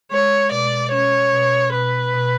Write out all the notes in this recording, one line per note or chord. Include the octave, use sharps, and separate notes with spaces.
G#3 C#5
B2 D5
C#4 C#5
B2
B2 B4
B2